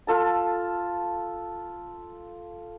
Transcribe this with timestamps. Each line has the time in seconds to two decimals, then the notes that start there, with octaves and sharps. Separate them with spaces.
0.07 F4 A4 A5